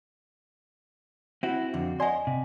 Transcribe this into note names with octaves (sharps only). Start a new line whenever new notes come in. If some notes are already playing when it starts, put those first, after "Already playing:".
C4 E4 F#4
F2 D3
D5 D#5 F#5 G#5 C6
C3